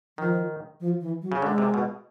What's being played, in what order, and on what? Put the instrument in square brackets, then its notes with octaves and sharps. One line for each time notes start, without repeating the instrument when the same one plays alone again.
[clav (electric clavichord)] D#3 [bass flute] F3
[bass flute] F3
E3
F#3
[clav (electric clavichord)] C#3
[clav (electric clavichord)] D3 [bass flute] G#3
[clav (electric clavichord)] C3
B2